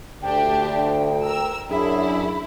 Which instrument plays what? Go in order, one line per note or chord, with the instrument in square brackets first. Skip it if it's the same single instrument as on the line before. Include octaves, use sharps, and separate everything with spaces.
[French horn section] D2 [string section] D4 G4 [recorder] G5
[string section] A#4 E6
[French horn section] F#2 D4 [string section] E4 [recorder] G#4